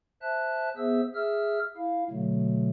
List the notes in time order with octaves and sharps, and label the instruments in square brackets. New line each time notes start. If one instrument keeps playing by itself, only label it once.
[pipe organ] C5 E5 A5 F#6
B3 G#4 C5 E5 E6
G#4 E5 E6 F6
E4 F5
B2 D3 F#3 A3